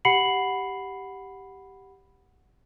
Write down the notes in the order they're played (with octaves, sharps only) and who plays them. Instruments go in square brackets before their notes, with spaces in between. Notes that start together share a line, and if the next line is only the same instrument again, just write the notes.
[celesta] G4 F#5 B5 C7 C#7 F#7